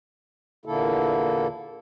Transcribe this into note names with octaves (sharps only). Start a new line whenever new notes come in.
E2 A#2 D3 A#3 E4 A4